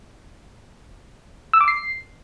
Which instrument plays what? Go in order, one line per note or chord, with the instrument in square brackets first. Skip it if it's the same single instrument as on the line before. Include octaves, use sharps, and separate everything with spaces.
[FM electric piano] E6
D6
C7